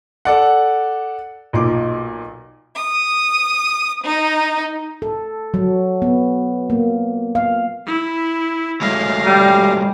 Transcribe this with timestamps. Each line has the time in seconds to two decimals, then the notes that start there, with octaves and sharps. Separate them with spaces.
0.25 A4 D5 F#5
1.53 B1 A#2 D#4 C6 D6
2.76 D#6
4.03 D#4
5.02 A4
5.54 F#3
6.02 B3
6.70 A#3
7.35 F5
7.87 E4
8.81 F#3 G#3 A3 F5 A#6
9.25 G3